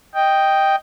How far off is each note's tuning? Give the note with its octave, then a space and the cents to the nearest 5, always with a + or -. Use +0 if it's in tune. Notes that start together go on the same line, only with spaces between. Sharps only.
D#5 +0 G5 +0